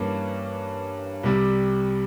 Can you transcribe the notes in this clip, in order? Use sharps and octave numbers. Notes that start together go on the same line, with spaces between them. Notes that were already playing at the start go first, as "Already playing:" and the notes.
Already playing: G2 E3 A#3 C#4
C2 C3 G3